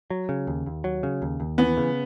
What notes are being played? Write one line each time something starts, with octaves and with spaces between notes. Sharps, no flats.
F#3
C#3
D#2
D#2
F#3
C#3
D#2
D#2
E3 B3
C#3